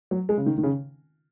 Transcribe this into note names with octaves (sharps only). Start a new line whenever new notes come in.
F#3
G#3
C#3
D#3
D#3
C#3